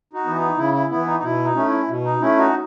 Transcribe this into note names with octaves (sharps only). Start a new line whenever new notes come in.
D#4 F#4
E3 B3
D#4
C#3 E4
E4
E3 B3 E4
D#4
D#4
B2 E4
D#4
A3 C#4
E4
B2
D#4
A3 C#4 E4
D#4 F#4